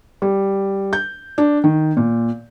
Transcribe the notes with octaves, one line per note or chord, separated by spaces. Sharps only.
G3
G6
D4
D#3
A#2